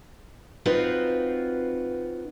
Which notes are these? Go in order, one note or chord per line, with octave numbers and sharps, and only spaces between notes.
C4 D#4 F4 F#4 B4 C5